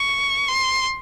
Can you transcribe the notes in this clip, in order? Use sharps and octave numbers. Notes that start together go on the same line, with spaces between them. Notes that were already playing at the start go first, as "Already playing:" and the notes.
Already playing: C#6
C6